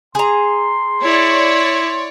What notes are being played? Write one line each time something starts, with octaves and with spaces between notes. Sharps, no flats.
G#4 A#5 C6
E4 C#5 D5